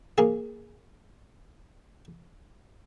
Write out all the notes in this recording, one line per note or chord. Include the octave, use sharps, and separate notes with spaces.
A#3 G#4